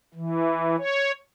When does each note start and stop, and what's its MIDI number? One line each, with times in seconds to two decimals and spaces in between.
0.14 0.76 52
0.78 1.12 73